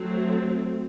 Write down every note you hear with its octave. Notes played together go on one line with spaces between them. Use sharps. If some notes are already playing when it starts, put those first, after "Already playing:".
Already playing: F#3 A3 C4